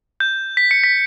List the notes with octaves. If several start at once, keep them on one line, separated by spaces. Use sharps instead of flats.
G6
B6
C#7
B6